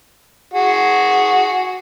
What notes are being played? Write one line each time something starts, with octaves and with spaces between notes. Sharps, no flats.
F#4 G#4